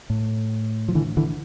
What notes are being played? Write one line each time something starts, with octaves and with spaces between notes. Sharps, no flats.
A2
F3
D3 E3
D3 E3